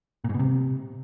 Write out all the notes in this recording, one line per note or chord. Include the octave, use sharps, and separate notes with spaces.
A#2
G#2
B2
C3